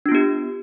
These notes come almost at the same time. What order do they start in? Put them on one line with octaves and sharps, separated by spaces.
D4 F4 B3 G4